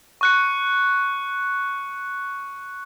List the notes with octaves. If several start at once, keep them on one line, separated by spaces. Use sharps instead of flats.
C#6 F#6 C#7